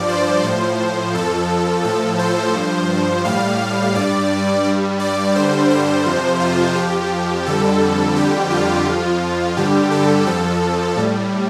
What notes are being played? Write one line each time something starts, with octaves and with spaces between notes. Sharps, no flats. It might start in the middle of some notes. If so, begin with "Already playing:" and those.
Already playing: G2 F3 D5
C5
A2 F3 C5
F2 F3 A4
A2 F3 A4
C5
G2 F3
A2 G3 F5
G2 G3 D5
G2 G3
D5
G2 D3 G3 C5
C5
F2 C3 F3
F4
F2 F3 G4
F2 D3 G3 A4
F2 D3 G3 G4
F4
F2 F3
G2 D3 G3 G4
A4
F2 F3 A4
A2 G3